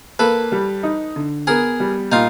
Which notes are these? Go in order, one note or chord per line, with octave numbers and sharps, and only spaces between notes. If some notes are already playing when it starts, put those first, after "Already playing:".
A#3 A4 B4
G3
D#4
D3
B3 G#4 A#4
G3
A#2 D#4 F4